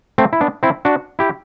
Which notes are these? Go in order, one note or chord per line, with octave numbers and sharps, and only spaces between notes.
A3 C4
E4
B3 D4
C4 E4
D4 F#4
E4 G4